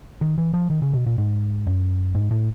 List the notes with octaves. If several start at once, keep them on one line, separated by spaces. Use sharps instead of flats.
D#3
E3
F3
D#3
C#3
B2
A#2
G#2
F#2
G#2
A2